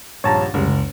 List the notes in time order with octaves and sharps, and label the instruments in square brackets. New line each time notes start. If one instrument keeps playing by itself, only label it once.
[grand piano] D#1 A#1 G2 [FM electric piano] C#5 A5 A#5
[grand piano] F#1 [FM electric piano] C#2 C#3 G3
[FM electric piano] C#2